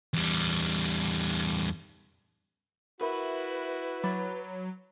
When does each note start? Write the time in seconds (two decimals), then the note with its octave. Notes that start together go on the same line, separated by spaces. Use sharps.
0.14 E2 G3
3.01 E4 F#4 A#4 B4 E5
4.03 F#3 B5 D6 A6